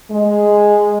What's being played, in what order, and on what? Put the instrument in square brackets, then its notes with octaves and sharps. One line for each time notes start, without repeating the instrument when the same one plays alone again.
[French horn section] G#3